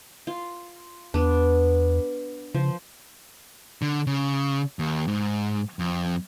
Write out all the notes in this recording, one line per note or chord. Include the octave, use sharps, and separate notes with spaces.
F4
E2 B3 D4
C#3 F3
D3
C#3
D#2
G#2
F2